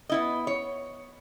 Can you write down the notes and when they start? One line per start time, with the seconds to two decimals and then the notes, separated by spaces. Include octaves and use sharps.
0.09 B3 E4 D#5
0.47 C#5